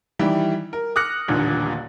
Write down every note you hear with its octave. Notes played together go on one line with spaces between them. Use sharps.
D#3 E3 G3 E4 G4
A#4
D6 D#6 F6 F#6 A#6 C#7
D#1 A1 D#2 A#2 D3